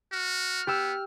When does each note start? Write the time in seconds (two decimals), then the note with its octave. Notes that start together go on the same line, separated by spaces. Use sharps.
0.12 F#4 F6
0.67 B3 G4 E6